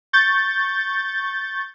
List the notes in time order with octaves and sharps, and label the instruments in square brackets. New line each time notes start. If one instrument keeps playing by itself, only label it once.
[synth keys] C#6 G6 A6